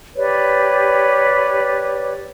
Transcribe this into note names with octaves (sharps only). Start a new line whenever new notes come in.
G4 B4 C#5 D5